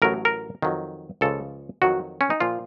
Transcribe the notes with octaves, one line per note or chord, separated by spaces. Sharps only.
A1 A2 F#3 A#4
A#4
F2 D#3 F#3
C#2 C#3 F3 A4
F2 D#3 F#3 F#4
C#4
D#4
A#2 F3 F4